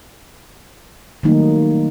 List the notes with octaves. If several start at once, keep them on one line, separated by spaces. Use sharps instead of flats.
D#3 F#3 G3 A3 A#3 D#4